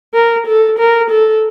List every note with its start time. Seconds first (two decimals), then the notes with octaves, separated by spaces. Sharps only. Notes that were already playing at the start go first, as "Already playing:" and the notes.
0.14 A#4
0.47 A4
0.79 A#4
1.10 A4